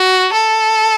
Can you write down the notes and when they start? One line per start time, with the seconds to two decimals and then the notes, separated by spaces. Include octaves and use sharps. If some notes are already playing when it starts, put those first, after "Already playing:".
Already playing: F#4
0.33 A4